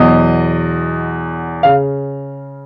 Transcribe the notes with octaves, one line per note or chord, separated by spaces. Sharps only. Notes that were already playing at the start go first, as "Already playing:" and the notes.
Already playing: E2 B2 F#3 D#5
C#3 F5